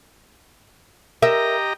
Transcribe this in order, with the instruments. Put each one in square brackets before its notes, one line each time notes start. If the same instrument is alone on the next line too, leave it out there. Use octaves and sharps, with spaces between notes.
[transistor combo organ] G4 D#5 A#5 [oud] A#4 E5